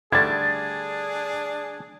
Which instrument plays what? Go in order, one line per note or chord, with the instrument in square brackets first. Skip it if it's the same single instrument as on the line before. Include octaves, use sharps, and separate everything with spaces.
[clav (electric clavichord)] D3 G3 A3 [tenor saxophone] D4 [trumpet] G#4 [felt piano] G#6 A6